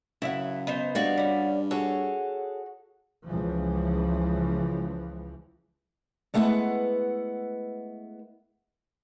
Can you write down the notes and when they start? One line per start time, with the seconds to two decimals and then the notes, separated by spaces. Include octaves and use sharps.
0.22 F#2 C#3 E4 E5 F#5
0.67 B3 D#4 C5
0.95 G2 F#4 D5 F5
1.17 G3 C#4
1.71 F#4 G#4 A4 C#5
3.26 C#2 E3 F3
6.34 G#3 A3 B3 E4 B4 F#5